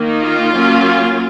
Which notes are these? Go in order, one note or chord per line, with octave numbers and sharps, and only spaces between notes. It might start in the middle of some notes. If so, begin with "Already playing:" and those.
Already playing: D#3 A#3 D#4
F4
F#3 A#3 C#4